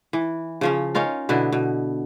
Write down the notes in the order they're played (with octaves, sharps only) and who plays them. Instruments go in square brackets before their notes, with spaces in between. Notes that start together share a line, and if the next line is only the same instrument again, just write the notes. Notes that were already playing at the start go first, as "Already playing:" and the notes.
[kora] E3
C#3 F3 C#4
C#4 D#4 F4 A#4
B2 D3 B3 E4
B2